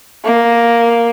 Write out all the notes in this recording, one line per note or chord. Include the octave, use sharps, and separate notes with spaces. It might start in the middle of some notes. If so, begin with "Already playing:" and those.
A#3